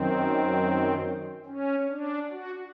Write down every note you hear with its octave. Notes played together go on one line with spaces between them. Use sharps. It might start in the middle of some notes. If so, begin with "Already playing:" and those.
Already playing: F#2 D#3 C4
C#4
D4
F#4